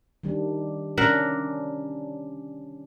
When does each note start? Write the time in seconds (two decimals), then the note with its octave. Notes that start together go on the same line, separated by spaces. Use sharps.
0.23 D#3 G3 D4
0.98 C3 C#4 D4 A#4 E5 F#5